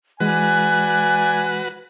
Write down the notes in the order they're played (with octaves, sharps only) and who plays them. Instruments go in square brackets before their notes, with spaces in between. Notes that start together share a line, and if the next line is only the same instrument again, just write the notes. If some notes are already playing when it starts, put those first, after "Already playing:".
[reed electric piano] E3 G#3 [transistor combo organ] F#4 B4 [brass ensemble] D5 G#5 [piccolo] F#6